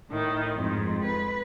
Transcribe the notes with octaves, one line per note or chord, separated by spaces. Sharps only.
A2 D#3
F2 G#2
B4